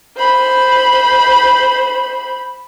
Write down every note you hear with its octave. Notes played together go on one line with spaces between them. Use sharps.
C5 B5